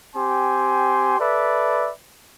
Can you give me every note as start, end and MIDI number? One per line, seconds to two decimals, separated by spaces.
0.15 1.19 60
0.15 1.19 67
0.15 1.19 80
0.15 1.19 84
1.20 1.90 69
1.20 1.90 71
1.20 1.90 74
1.20 1.90 76